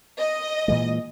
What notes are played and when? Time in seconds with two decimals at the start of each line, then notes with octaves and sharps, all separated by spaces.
0.20 D#5
0.68 A#2 E3 G#3